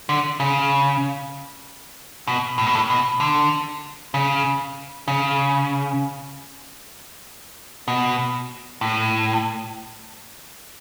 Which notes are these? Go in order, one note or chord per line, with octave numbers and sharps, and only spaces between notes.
D3
C#3
B2
A2
B2
A2
B2
D3
C#3
C#3
B2
A2